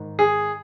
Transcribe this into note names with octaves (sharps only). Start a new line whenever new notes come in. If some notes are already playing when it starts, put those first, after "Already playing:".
Already playing: G#2 D#3
G#4